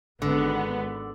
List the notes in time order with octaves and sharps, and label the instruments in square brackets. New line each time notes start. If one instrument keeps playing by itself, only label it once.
[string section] G#1 B3 [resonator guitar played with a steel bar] D3